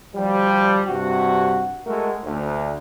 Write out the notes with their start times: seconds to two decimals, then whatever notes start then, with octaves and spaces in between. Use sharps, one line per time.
0.15 D2 F3 G3
0.88 G2 C3 F#4
1.86 G#3 A3 F#4 A4 A#4
2.25 D2